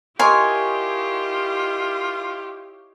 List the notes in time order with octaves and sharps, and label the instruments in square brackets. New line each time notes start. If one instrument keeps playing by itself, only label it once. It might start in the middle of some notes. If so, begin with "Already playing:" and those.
[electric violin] E4 G4 [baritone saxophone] F4 [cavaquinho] A#4 G#5 C6 [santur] C#5 D#5